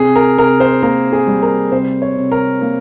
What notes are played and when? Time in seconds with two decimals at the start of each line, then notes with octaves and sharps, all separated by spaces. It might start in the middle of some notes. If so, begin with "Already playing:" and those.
Already playing: C3 G#4
0.16 A#4
0.38 C3 A#4
0.60 C5
0.83 A#3 A#4
1.13 G#4
1.27 G3
1.42 A#4
1.72 C3 C5
2.02 C#5
2.17 C3
2.32 A#4
2.61 A#3